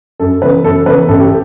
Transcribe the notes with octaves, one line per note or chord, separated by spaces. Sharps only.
F#2 A4
C#3 E3 B3 B4
F#2 A4
C#3 E3 B3 B4
A1 A4
G4